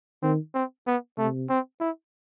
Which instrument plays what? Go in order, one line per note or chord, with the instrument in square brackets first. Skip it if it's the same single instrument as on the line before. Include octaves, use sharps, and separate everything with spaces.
[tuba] D#3 [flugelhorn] C4
[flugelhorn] C4
B3
[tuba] C3 [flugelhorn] A3
[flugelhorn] C4
E4